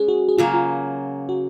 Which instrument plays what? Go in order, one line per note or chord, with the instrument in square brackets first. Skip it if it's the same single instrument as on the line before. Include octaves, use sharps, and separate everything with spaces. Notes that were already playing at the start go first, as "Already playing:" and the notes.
Already playing: [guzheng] G#3 C#4 [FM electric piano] G#4
[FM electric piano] F#4
G#4
[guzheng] C#3 F#3 A#3 [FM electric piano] F4
[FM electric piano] F4
F#4